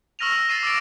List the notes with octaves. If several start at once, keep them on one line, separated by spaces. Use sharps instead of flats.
C#6 E6 F6 A#6 D#7 F7
E6 A#6
A6 A#6 C7 D#7 E7
D6 E6 A6 A#6 D7